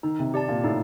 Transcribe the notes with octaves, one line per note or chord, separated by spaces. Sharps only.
D#3 D#4
C3
G4 D5 A5
A#2
A2 D#4